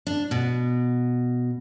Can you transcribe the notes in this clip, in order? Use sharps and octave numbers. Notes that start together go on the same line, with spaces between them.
D4
B2